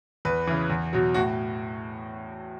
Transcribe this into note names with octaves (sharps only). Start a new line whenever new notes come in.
E2 B4
C#3 E3
E2
B2 F#3
A2 F#4